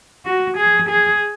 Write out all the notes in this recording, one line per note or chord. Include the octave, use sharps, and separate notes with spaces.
F#4
G#4
G#4